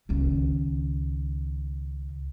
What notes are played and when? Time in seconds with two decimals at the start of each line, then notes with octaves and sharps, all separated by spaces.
0.09 C#2 D#3